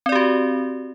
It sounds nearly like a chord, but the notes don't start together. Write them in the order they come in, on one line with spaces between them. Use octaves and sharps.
C4 D5 G4 F#4